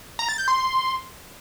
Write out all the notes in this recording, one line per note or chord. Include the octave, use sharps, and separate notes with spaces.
A#5
A6
G6
C6